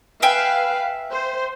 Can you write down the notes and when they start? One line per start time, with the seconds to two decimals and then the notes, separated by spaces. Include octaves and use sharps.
0.22 B4 E5 F5 G5 G#5
1.11 C5